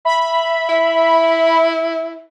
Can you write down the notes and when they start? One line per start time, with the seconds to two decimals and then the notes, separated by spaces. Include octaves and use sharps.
0.05 E5 B5
0.69 E4